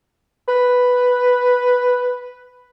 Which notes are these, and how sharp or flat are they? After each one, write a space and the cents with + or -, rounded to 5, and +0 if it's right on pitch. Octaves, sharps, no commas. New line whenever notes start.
B4 +0